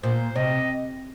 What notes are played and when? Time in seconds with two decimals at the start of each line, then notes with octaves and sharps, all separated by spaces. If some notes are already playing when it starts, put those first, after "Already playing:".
0.03 A#2 C5
0.36 C3 D#5